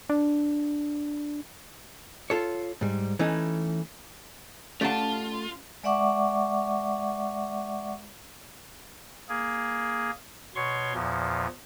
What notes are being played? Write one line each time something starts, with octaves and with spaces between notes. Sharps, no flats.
D4
F4 A4 C#5
G#2 G3
E3 A3 C#4 D#4
A3 C#4 F4 G4 D5 F#5 A5
G#3 D5 E5 F#5 C#6 D6
A#3 G#4
B2 C#5 C6 C#6
E2 A#2 F3